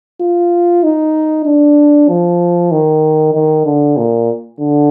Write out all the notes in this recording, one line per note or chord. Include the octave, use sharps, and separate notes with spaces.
F4
D#4
D4
F3
D#3
D#3
D3
A#2
D3